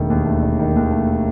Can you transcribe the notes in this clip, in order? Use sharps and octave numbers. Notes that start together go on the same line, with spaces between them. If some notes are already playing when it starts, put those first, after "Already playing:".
Already playing: E1 D#3 A3
D#2
A3
E1
D#3
D#2
A3